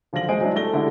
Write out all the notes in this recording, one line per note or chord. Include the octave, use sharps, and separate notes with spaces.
D3 F3 F#3 F5 A#6 F#7
G#3 C5 D#5 G#5 D7
F#3 G3 D4 E4
A3 A#6 G7
D3 G#3 E4 G4 A4 F#5